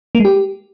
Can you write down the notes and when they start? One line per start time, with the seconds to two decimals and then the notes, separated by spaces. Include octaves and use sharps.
0.15 A#3
0.20 G#3
0.25 G4